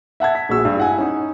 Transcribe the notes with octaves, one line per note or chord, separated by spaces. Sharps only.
E5 F#5 A5 G#6
B6
A#1 G#3 F#4 E6
G2
E4 F#5 G#5
C#4 D#4